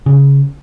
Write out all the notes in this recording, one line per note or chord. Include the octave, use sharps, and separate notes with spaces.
C#3